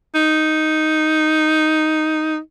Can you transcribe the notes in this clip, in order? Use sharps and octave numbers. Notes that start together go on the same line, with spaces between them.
D#4